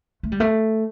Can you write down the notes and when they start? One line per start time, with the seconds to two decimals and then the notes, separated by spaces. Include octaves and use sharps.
0.23 A3
0.32 G3
0.40 A3